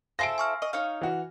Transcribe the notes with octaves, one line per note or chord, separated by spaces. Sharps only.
E4 A4 C5 F5 G#5 A#6 C7 D7
G#5 C#6 F6
D#5 C#6
D#4 C#5 F5 F6
E3 F#4